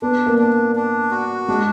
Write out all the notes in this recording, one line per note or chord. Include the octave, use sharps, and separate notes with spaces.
B3 D4
A#3
D4
D4
F#4
G#3 D4